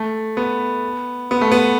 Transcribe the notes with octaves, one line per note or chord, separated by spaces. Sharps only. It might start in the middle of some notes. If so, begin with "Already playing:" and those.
Already playing: A3
B3
B3
A3
B3